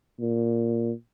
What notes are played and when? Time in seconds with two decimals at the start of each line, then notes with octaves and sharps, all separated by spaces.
0.20 A#2